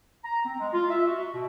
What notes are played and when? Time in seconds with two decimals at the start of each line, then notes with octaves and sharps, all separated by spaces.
0.25 A#5
0.45 C4
0.60 G#3
0.73 F4
0.90 E5
1.07 F#4
1.34 B2